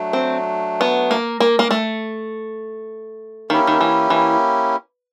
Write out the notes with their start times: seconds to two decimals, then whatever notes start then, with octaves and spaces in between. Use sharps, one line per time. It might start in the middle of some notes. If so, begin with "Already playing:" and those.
Already playing: F#3 A3 D4
0.13 C4
0.81 B3
1.11 A#3
1.40 A#3
1.59 A#3
1.71 A3
3.50 D#3 A#3 C#4 E4 G4
3.67 D#3
3.81 E3
4.10 E3